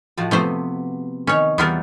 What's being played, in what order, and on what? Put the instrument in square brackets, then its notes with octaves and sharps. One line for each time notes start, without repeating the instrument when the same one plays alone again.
[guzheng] A2 F3 F#4
[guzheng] C3 B3 [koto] F3 A3 C5
[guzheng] D#3 [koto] C#4 C#5
[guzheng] E2 G3 F#5 [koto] B3 F4 A#4